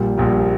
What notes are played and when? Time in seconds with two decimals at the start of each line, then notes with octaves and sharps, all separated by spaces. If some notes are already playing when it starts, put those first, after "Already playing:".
Already playing: A#1 A#2 G3
0.18 A#1 A#2 G3